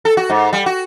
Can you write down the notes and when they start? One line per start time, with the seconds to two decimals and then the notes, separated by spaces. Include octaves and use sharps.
0.05 A4
0.17 F#4
0.30 G#2
0.53 G3
0.66 F#4